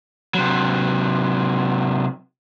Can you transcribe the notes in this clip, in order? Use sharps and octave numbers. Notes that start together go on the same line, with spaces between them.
C3 F#3